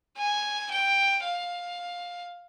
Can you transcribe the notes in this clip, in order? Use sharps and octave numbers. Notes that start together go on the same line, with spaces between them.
G#5
G5
F5